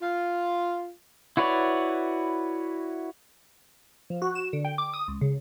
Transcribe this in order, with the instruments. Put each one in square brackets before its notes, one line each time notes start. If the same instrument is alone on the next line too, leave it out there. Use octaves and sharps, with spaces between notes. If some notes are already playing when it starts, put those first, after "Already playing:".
[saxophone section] F4
[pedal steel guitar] E4 F#4 B4 C#5 D5
[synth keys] F3
F#4
E7
D3
G5
D6
D#6
C#2
C#3